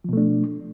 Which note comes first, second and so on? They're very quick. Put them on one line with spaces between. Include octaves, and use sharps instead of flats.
F3 B2 A3 D4